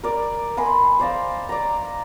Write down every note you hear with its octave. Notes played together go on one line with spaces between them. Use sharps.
A#4 D5
D#5 G#5 B5 C6
C5 D5 D#5 F5
D5 A#5